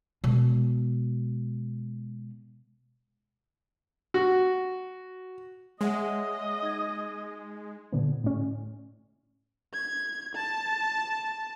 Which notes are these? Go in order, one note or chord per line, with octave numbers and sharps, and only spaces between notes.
B2 G#3
F#4
G#3 C#5 D#5 E5 F#5
D#4 G#6
A#2 D3 B3
A2 C#4
G#6
A5